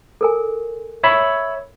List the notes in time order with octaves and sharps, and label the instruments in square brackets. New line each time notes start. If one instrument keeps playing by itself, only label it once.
[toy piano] A4 A#4 G#5
[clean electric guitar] C#5 E5 B5